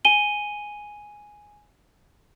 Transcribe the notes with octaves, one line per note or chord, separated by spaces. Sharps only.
G#5 D#7 G7